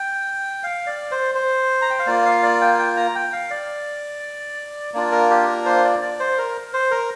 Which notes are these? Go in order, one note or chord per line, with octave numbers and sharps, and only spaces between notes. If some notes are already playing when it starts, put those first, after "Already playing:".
Already playing: G5
F5
D5
C5
C5
A#5
G5
F5
A#3 F4 D5
F5
D5
G5
G5
A#5
G5
F5
D5
A#3 D4 F4 D5
A#4
G4
A#4
C5
D5
D5
C5
A#4
C5
A#4